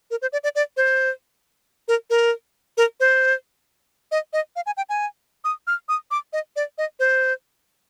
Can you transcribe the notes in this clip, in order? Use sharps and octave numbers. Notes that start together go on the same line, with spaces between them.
A#4
C5
D5
D5
D5
C5
A#4
A#4
A#4
C5
D#5
D#5
F5
G#5
G5
G#5
D#6
F6
D#6
D6
D#5
D5
D#5
C5